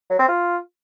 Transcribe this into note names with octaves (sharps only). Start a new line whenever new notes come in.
F#3
C4
F4